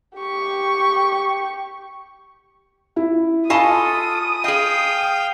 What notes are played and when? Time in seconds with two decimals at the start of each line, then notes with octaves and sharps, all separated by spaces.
0.17 G4 C#6
2.96 E4
3.50 F4 A4 D#5 G#5 A5 B5 C#6 D#6
4.44 G#4 D#5 F5 G5